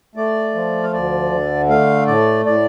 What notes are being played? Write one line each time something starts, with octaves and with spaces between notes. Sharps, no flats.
A3 D5
F3
F5
D2 D5
D3
A3 F5
A2 D5
A2 D5